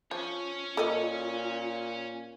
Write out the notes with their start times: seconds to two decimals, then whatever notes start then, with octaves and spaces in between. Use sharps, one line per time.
0.11 F3 C#4 F4 C#5
0.77 A#2 A4 A#4 D#5